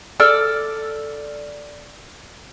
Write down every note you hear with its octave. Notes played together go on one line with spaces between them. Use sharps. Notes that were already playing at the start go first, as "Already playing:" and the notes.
A4 D5 E6 F6